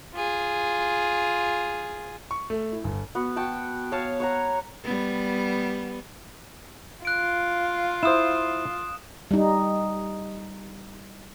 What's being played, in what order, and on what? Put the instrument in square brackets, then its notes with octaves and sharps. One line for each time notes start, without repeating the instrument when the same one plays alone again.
[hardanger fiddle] F4 G#4
[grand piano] C#6
A3
E4
G1
[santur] B3 F#4
F#4 G5 A5
C#5 F5 G#5 A5
C#5 F#5 A#5
[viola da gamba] G3 B3
[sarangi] F4 [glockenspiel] F#6 D7
[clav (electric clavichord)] E4 C5 [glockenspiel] D#6 E7
[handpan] G3 D#4